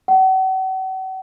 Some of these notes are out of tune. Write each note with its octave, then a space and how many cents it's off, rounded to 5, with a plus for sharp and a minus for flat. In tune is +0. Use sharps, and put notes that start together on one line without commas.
F#5 +40